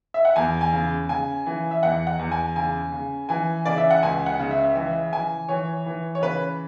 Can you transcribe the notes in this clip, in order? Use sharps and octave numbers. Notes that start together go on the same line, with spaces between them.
E5
F#5
E2 G#5
G#5
C#3
C#3 G#5
E3
E5
E2 F#5
F#5
E2
G#5
C#3 G#5
C#3
E3 G#5
C#3 D5
E5
F#5
C#2 G#5
F#5
C#3
E5
E3 E5
E3 G#5
E3 C#5
E3
C#5
C#3 B4